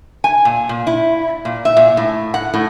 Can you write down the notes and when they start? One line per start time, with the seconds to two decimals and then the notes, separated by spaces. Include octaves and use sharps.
0.24 G#5
0.45 A#2
0.69 A#2
0.87 E4
1.45 A#2
1.65 E5
1.77 A#2
1.97 A2
2.34 F#5
2.54 A2